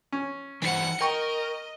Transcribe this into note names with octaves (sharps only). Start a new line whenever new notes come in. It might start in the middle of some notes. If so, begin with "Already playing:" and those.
C#4
E3 D#4 C5 F#5 C#7
A#4 D#5 G5 C#6